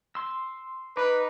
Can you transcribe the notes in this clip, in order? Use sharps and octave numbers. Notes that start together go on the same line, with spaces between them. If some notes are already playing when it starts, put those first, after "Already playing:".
C6 E6
D#4 B4 D6